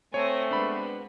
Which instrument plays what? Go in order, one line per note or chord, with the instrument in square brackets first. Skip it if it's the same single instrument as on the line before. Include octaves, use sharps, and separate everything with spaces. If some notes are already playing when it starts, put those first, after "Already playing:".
[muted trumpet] A3 [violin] C4 [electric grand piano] C#5 [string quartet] G#5 D#6 A#6
[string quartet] B2 G#3 B3 [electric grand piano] D4 B5